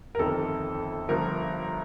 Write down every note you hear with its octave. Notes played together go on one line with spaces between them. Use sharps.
A#4
G1 F2 D#3 A4
G1 G2 F3 A#4